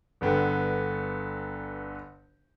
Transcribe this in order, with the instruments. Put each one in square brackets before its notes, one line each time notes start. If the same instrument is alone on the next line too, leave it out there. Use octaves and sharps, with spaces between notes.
[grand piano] G1 D3 B3 G5